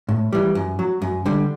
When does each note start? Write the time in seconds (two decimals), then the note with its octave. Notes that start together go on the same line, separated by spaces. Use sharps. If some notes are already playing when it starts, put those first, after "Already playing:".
0.09 A2
0.33 E3 G3
0.55 F#2
0.79 F#3
1.02 F#2
1.26 D3 G3